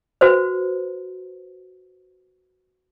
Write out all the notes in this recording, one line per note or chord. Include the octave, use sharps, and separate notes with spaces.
F#4 B4 C5